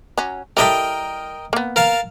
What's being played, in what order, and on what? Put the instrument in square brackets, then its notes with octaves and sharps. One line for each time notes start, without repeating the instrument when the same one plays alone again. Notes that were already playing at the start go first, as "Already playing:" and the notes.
[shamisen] F#3 C#4
[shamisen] G3 E4 A4 [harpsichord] A#4 D#5 G5
[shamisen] A#3 B3
[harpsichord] A#4 F5 A5